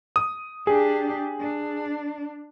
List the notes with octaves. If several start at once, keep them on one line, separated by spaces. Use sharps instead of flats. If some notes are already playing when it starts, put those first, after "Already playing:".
D#6
D4 G4 G#4
D4